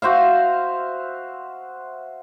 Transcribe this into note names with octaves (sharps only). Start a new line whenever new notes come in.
F#4 C5 E5 F5